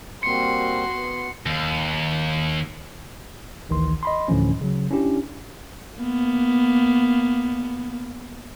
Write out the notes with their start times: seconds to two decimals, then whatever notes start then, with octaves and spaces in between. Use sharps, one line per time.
0.23 G3 A#3 C4 F#4 C6 C#7
0.91 B3
1.46 D#2
3.69 A1 D2 D#3 E3 C6
4.03 D#5 B5 C6
4.28 D2 A2 D3 E3 F3 C#4
4.61 C#3 F#3
4.91 C#4 D4 E4 G4
5.97 A#3 B3